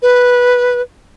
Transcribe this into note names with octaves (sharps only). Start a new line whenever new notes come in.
B4